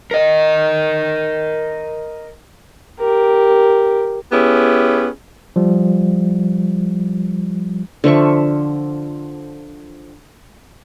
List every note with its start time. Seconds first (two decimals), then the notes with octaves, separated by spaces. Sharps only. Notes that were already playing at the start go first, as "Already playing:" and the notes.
0.11 A#4 D#5
3.00 G4 A#4
4.32 B3 C#4 E4 G4 G#4
5.56 F3 G3
8.04 D3 F3 E5 C#6